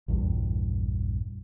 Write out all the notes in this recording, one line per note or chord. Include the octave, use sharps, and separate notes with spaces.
A#1 E2 G2